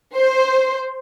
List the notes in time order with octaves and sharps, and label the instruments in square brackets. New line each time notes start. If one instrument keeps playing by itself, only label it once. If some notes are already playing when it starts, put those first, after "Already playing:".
[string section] C5